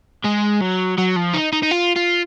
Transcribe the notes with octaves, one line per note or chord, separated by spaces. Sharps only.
G#3
F#3
F#3
F3
D#4
D#4
D#4
F4
F4